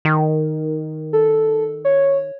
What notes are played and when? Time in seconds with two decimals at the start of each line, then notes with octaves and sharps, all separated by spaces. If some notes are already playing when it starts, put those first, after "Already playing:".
0.05 D#3
1.13 A4
1.85 C#5